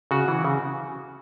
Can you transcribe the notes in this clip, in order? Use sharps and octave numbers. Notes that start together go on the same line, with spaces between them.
C#3 F#4
E3
C#3